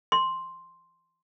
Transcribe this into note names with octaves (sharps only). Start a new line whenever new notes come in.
C6